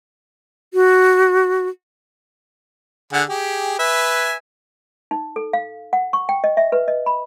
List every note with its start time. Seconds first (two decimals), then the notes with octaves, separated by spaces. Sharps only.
0.74 F#4
3.13 D3 G#4 F#5
3.29 G4 G#4
3.79 B4 E5 G#5
5.11 D#4
5.36 A4
5.53 F5
5.93 F#5
6.13 C#6
6.29 G5
6.44 D#5
6.57 E5
6.72 B4
6.88 D#5
7.06 B5